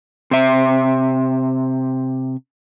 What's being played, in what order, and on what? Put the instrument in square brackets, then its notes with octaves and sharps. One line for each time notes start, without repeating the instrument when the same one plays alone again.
[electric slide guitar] C3 E5